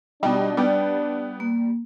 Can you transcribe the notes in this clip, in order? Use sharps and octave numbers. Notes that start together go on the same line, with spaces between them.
B2 G3 D4 D#4
G3 B3 G5
A#3